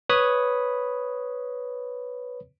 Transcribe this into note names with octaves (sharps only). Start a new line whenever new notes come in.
B4 C#5 B5 D#6